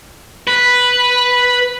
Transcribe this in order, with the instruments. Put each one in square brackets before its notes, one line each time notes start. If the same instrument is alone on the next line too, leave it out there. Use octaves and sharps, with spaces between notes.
[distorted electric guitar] B4